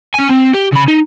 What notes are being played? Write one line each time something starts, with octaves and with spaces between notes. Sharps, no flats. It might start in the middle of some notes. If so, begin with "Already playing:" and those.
C#4 G#5
C4
G4
C#3 B5
D#4